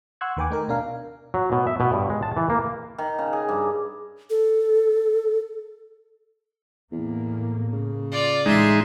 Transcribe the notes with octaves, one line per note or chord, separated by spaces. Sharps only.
F#5 C6 C#6 E6 F#6 G#6
D#2 D#3 B4 G5 G#5 D6
A3 D#4 A#4
B2 D4 A#4 F5 G#5
F#3
B2
E5
B2
G2
G#3
A5
E3
A#3
D#3
C#3
G#4
G2
A4
E2 A2 A#3
C#3
F4 D5
A1 G#3 D#4 E5 C6